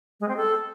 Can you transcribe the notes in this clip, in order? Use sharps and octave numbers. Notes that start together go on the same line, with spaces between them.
G#3
C4
A4